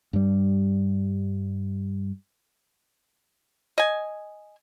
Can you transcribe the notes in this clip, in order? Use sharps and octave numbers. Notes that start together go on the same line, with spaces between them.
G2 G3
D#5 G#5